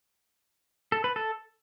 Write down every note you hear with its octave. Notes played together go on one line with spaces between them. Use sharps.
A4
B4
A4